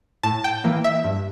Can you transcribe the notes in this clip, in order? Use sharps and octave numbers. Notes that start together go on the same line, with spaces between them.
A2 A5
G5
E3 A#3
E5
G2